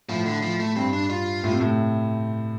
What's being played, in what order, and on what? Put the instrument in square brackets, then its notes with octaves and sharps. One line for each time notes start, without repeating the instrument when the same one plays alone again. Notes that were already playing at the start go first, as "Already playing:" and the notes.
[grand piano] A2 [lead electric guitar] F3
[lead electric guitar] D3
F3
A3
[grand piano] G2 [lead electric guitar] C4
[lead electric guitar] D4
F4
[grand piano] A2
C3
A2